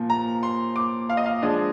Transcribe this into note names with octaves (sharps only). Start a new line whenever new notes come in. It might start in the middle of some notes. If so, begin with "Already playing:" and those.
Already playing: A#2 F3
A#5
C6
D6
F5
D#5
F5
F3 G#3 D4 D#5